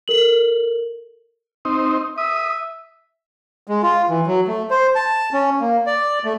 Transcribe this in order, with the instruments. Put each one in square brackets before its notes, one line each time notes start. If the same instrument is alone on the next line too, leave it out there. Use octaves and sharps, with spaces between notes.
[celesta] A4 A#4 F#7
[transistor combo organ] C4 D#4
[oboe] E5 [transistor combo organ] D#6
[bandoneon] G#3
F4
E3
F#3
A3
C5
A5
C#4
A#3
D5
A3